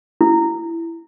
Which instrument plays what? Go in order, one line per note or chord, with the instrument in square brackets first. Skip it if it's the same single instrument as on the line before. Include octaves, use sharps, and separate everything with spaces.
[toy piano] E4